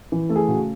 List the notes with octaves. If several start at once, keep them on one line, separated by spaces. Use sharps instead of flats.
E3
A3 A4
G#4
C#3 F#4